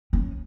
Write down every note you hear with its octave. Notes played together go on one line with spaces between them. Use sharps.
C#4